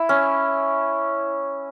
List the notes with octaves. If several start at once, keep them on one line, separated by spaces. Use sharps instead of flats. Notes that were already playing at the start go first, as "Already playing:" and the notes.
Already playing: E4
C#4